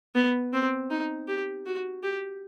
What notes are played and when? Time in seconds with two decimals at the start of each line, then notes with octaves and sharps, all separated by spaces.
0.15 B3
0.53 C4
0.90 D#4
1.28 G4
1.66 F#4
2.03 G4